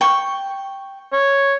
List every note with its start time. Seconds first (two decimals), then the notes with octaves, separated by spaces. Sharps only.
0.01 G5 C#6
1.13 C#5